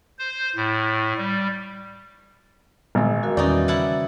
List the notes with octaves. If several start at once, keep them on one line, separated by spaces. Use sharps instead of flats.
C5
A2
G3
G#1 A#2 D3 G#3
F#4 A#4 F5
E2 D#3 E3 G3 C#4 D#4 D5
C#3 E4 F#5 A5